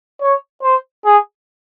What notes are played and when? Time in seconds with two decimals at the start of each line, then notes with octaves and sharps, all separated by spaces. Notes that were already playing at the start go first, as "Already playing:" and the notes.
0.21 C#5
0.63 C5
1.05 G#4